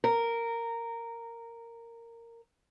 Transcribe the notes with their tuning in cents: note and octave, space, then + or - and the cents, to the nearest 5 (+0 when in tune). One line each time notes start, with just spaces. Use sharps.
A#4 -10